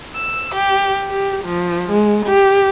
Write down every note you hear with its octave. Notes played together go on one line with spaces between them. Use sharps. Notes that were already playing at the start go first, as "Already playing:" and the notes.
E6
G4
G4
F3
G#3
G4